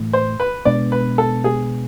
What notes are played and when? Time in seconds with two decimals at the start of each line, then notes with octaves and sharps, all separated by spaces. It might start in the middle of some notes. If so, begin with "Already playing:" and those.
Already playing: A2 E3 A3
0.13 C5
0.40 B4
0.65 B2 G#3 B3 D4 D5
0.92 B4
1.18 A4
1.44 G#4